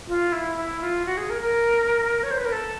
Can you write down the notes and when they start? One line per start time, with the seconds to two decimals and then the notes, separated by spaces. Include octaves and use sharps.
0.08 F4
0.32 E4
0.56 E4
0.81 F4
1.06 F#4
1.17 G#4
1.30 A#4
1.41 A#4
2.23 C#5
2.31 C5
2.37 B4
2.45 A#4
2.52 A4